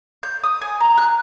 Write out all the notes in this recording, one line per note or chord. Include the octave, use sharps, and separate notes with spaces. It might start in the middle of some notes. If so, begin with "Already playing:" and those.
G6
D#6
G#5
A#5
F#6